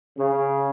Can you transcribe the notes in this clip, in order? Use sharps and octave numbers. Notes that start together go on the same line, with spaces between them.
C#3